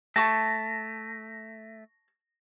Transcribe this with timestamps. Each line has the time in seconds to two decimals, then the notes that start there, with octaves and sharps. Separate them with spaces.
0.16 A3 A5 C#6 A#6